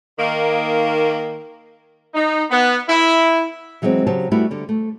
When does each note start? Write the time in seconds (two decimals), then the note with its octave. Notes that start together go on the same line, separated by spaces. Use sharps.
0.19 D#3 A#3
2.14 D#4
2.51 B3
2.89 E4
3.82 E3 F#3 G#3 A#3 C4
4.07 C#3 F#3 G4 C5 A5
4.31 G3 A3 B3 E4 F#4 G4
4.51 D3 G3
4.69 A3